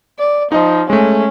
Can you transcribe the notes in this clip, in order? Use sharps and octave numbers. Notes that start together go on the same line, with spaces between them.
D5
F3 D#4 D#5
G#3 A3 C#4